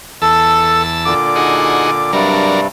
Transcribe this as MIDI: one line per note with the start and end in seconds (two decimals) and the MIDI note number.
0.22 1.14 40
0.22 0.83 69
0.22 1.14 81
0.22 1.14 88
1.05 2.12 46
1.05 2.12 50
1.05 2.12 86
1.36 1.91 63
1.36 1.91 66
1.36 1.91 68
2.13 2.67 43
2.13 2.67 48
2.13 2.61 54
2.13 2.67 55
2.13 2.61 62
2.13 2.61 70